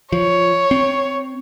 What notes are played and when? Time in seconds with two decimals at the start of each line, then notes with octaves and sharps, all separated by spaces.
0.12 F3 C#5
0.71 C4